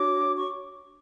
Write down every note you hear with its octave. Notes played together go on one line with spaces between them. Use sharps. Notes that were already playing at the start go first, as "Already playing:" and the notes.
Already playing: D4 F#4 C#5 D6
C#6